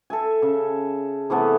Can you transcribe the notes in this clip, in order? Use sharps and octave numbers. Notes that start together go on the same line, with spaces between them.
A4 E5 G#5
C#3
C3 E3 A3 B3